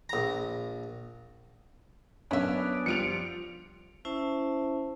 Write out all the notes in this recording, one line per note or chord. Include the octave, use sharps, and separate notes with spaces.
A#1 A#5
F#2 B3 C#4 D4 E5
F3 G3 F4 C#7 D7 F7
C#4 E4 C5 E5 A5